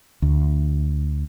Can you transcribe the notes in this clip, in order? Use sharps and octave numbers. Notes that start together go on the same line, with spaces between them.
D2